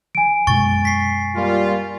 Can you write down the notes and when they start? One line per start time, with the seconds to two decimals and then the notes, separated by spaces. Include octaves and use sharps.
0.15 G#5 D7
0.47 F#2 B2 G#3 C#6 A6
0.85 B6 C7
1.35 G3 A#3 F4